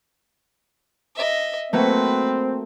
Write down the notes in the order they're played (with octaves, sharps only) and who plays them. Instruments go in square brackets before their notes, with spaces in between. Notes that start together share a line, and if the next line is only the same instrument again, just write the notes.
[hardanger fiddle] D#5 E5
[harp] A3 A#3 F#4 [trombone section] C4 [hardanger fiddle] B4